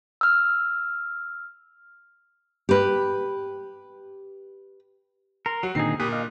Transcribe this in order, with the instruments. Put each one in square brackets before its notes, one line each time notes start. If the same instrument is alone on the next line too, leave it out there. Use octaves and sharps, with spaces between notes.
[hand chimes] E6 F6
[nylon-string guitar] G4 B4
[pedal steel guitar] A#4 [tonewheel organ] C6
[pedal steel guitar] F#3 [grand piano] F#4
[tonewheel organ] A#2 D3 D#3 [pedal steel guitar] C4 D#4 G#4 [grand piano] C7
[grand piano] A#2 [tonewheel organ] G4 B5 D#6 [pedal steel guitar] F#6
[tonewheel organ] D#5 F5